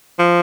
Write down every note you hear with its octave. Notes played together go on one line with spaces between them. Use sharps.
F3